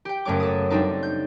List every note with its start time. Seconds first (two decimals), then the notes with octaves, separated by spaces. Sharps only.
0.05 G4 G5
0.25 F#1 F#2 A3 C#5 D6
0.40 A4 D#6
0.70 G3 A3 C4 D4 D#4 A4
1.03 G6